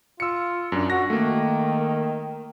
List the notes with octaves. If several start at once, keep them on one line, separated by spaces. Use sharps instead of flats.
F4 E6 C#7
F#2 D4
F#4 A#6
D#3 A3 A#3